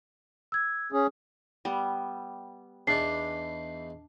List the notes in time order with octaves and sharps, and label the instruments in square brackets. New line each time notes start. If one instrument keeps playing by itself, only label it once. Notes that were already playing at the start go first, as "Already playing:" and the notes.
[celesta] E6 G#6
[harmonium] C#4 G#4
[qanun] G3 B3
[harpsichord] E2 E3 D#4 [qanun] D4 [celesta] C7